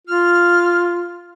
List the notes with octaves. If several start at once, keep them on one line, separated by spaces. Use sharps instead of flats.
F4 F6